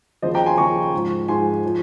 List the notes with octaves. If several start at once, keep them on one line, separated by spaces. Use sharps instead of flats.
D#2 C#3 F3 C5 D#5
G5 A#5
G#5 C6
D#2 C#3 F3 A#5 C#6
G#2 F3
G#2 F3 G#5 C6
F3